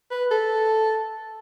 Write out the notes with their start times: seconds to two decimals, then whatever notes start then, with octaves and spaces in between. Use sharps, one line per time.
0.11 B4
0.31 A4